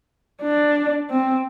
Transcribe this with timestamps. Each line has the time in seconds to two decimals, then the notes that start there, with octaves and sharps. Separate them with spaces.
0.42 D4
1.10 C4